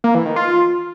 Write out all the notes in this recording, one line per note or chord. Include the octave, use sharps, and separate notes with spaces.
A#3
E3
D#3
F4